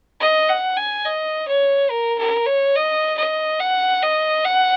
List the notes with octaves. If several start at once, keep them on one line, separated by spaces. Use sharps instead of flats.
D#5
F#5
G#5
D#5
C#5
A#4
A#4
C#5
D#5
D#5
F#5
D#5
F#5